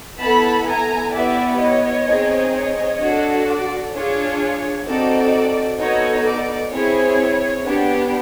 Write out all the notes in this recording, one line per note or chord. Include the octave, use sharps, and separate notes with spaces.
B3 E4 A4 A5 B5
G#5 A#5
B3 E4 G4 D5 E5
C#5 D#5
C4 D#4 G#4
C#5 D#5
D4 F#4 A4
D5
D4 F4 G#4 C#5
C4 D#4 F#4 A4 D5
B3 D#4 F#4 A4 C#5 D#5
D5
C4 E4 G#4 C#5
B3 D4 G4